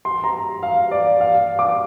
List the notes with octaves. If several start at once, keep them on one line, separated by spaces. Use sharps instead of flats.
C6
A#5
F5
D5
F5
D6